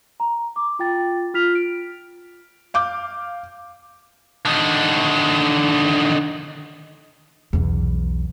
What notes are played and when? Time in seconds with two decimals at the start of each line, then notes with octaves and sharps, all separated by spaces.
0.20 A#5
0.56 D6
0.79 F4 G5 A6
1.34 F4 F6 B6 F7
1.55 D7
2.74 F5 D6 G6
4.45 D3 D#3
7.53 B1 E2